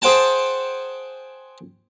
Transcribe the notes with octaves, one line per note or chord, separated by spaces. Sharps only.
G#4 C5 F#5 G5 A5